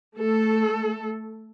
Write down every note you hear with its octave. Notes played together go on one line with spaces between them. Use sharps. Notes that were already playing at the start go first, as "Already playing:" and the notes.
A3 A4